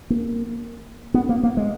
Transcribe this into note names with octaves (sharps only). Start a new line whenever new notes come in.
A#3
B3
A#3
A#3
G#3